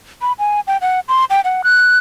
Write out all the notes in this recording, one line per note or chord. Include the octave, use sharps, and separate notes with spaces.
B5
G#5
G5
F#5
C6
G5
F#5
F#6